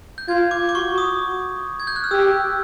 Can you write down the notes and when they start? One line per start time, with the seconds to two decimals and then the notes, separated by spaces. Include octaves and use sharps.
0.18 G6
0.28 F4 G#6
0.51 D6
0.69 D6
0.75 F#4 C#6
0.98 D#6
1.80 G#6
1.87 G6
1.96 F#6
2.04 F6
2.11 G4 E6